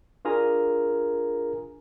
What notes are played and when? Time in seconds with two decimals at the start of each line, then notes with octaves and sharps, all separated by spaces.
0.25 D4 F4 G#4 A#4 G#5 A#5